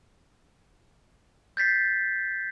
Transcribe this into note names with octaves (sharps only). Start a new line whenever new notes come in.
G6 A6 B6 C7